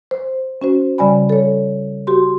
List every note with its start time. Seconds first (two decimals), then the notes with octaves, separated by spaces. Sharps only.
0.11 C5
0.62 C#4 F#4 C5
0.98 C#3 G3 D5 G#5 B5
1.29 A4 C#5
2.07 F#4 G4 C6